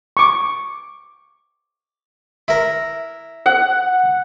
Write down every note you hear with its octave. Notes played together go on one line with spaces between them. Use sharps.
C#6 D6
E4 A#4
F#5